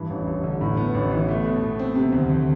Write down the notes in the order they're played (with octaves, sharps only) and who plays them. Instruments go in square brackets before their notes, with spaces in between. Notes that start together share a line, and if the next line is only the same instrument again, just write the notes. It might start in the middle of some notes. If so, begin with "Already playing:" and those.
Already playing: [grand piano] G2 E3
A1
A1
D3
A2
B3
A1
E3
A3
B2
B2
C4
C3
D2
D2